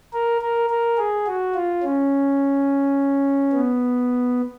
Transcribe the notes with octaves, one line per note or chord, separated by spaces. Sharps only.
A#4
A#4
A#4
G#4
F#4
F4
C#4
B3